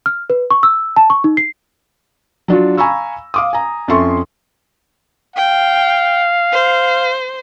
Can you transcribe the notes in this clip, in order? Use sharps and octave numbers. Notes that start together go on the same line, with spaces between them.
F6
B4
C#6
E6
A5
C#6
D#4
C7
F#3 D4 F4 F#4
F5 G#5 A#5 B5 C#6 E6
F5 D6 D#6
G#5 A#5
F2 C#4 A4 E5 C6 C#6
F5 G5
C5